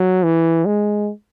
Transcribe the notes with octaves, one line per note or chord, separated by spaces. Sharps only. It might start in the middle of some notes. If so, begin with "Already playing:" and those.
Already playing: F#3
E3
G#3